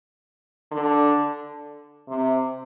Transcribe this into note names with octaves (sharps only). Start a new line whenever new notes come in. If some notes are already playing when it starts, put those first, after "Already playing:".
D3
C3